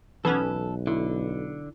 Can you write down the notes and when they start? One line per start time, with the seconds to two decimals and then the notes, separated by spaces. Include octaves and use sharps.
0.25 B1 E3 B3 C#4 A4 B4
0.87 D3 E4